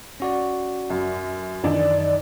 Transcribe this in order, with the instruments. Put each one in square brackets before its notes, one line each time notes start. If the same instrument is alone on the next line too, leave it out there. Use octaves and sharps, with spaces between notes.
[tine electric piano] C#4 F#4 D5
[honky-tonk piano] F#2
[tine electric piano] F#2 D#3 [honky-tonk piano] E3 D4 D#4 [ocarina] D5